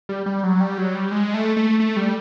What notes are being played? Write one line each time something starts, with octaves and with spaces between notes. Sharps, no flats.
G3
G3
F#3
G3
F#3
G3
G#3
A3
A3
A3
G3